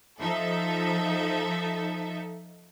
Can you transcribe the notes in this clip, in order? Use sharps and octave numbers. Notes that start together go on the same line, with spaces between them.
F3 D#4 A4 E5